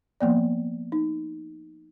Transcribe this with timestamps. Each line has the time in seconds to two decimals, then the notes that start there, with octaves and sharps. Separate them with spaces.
0.20 F3 A#3 B3 D5
0.92 D#4